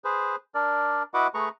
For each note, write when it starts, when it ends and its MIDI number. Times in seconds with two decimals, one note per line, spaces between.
0.04 0.36 68
0.04 0.36 71
0.04 0.36 72
0.55 1.03 62
0.55 1.03 70
0.55 1.03 74
1.14 1.27 64
1.14 1.27 66
1.14 1.27 71
1.14 1.27 75
1.14 1.27 78
1.14 1.27 86
1.34 1.49 57
1.34 1.49 68
1.34 1.49 71
1.34 1.49 82
1.34 1.49 85